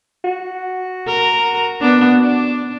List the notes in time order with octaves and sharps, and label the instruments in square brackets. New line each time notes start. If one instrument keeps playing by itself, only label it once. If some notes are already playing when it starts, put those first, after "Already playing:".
[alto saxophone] F#4
[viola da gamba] A#4
B3 D4
D4